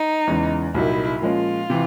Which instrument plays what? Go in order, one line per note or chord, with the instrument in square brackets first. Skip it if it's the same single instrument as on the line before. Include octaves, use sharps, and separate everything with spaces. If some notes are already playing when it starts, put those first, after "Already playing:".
Already playing: [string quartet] D#4
[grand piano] E2 C#3 E3 G#3
[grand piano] C2 A#2 F#3 A#3 D#4 [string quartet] E4
[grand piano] A#2 F3 G#3 C#4 [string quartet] F4
[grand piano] C3 E3